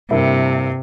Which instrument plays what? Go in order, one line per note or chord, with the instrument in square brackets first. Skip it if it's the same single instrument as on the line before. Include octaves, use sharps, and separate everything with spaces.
[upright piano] G2 A#3 E4 [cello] C3